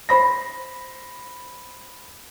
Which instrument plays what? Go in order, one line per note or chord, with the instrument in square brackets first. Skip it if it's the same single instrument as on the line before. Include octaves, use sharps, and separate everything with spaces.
[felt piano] C5 B5 A#6